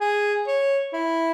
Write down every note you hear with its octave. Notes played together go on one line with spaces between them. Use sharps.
G#4
C#5
E4